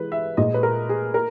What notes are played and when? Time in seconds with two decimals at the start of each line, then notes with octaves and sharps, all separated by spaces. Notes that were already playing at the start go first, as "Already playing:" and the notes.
Already playing: E3 G#3 B4
0.12 E5
0.37 A#2 G#3 D#5
0.54 B4
0.63 A#4
0.89 G#4
1.14 A#4